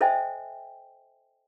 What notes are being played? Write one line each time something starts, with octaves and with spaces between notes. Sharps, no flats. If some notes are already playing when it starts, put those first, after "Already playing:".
A4 C5 D#5 E5 G5 G#5